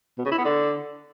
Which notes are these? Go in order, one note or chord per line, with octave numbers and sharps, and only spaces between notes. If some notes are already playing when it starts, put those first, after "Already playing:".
B2
C#3
E4
B3
D3